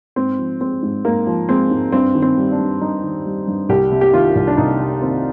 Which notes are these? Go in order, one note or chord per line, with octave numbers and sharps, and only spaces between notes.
G#2 C4
F3
G#3 C4
G#2
G#2 A#3
F3
G#3 C4
G#2
G2 C4
D#3
C4
G3
D4
G2
G2 D#4
D#3
G3
G2
C2 G4
C3
G4
D#3 F4
C2
D4
C2 D#4
C3
D#3 C4